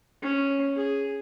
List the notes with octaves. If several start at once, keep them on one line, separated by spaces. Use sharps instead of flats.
C#4
G#4